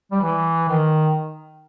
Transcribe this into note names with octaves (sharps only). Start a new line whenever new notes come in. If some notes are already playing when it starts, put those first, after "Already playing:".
G3
E3
D#3